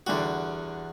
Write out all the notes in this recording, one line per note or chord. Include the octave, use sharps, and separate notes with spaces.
E2 D3 G3 F#4 G4